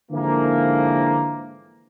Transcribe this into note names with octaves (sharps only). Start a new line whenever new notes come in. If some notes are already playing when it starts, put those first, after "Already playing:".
G#2 D3 E3 F3 A#3